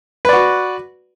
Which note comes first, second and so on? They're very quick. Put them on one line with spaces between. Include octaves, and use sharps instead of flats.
B4 D5 F#4